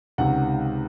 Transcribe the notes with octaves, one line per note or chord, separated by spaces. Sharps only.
C#2 C3 D#3 F#5